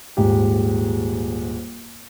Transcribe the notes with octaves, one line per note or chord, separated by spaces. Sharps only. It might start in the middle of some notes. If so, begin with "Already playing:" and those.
D#1 G#2 G4